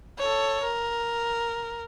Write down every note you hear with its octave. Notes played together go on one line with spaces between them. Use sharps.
A4 C#5
A#4